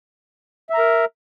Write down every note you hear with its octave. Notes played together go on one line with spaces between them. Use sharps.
A#4 E5 A#5